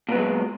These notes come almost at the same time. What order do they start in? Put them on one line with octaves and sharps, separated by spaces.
A#2 B3 F#3 G#3